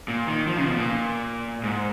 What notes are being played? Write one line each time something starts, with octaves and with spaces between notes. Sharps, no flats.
A#2
D#3
F3
C#3
B2
A#2
G#2